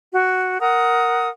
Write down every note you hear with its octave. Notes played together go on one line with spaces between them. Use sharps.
F#4
A#4 F#5 D#6